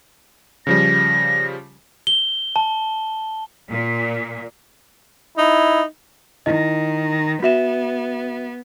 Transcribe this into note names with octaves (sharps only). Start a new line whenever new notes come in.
C#3 F3 G3 A#6
G7
A5
A#2
D#4 E4
D#3 E4 D#5
B3 F#4 E5 E7